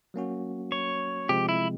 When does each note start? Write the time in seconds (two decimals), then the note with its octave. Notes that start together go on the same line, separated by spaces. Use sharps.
0.14 F#3 A#3 C#4 F#4
0.72 C#5
1.29 C3 F3 G#3 C4 G4
1.49 E4